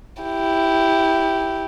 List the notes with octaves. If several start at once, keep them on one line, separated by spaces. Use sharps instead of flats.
E4 G4